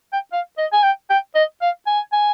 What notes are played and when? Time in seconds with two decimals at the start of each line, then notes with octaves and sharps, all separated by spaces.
0.13 G5
0.33 F5
0.58 D#5
0.73 G#5
0.83 G5
1.10 G5
1.35 D#5
1.62 F5
1.87 G#5
2.13 G#5